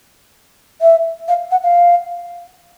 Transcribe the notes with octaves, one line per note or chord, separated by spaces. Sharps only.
E5
F5
F#5
F5